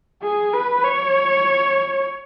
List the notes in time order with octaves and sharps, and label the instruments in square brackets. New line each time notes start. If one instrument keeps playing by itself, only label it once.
[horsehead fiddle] G#4
B4
C#5